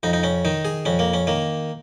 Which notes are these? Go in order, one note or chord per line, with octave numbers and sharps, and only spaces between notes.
F2 D#4
D#4
C#4
D#3 D#4
G#4
F2 C#4
A#3
C#4
D#3 A#3